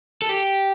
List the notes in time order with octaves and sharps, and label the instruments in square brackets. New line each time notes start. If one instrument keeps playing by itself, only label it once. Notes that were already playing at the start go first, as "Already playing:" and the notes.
[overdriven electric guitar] A4
G4